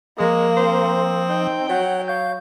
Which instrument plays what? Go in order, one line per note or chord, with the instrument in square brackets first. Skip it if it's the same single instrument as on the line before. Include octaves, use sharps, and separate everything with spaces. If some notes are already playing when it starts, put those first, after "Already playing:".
[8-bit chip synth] F3 D#6 [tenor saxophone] G#3 [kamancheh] A#3
[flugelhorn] C4 [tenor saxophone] C5
[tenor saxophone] D#4 [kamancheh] G5
[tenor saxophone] F#3 [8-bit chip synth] C#5 [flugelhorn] F#5
[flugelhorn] C#5 [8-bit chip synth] F5 G6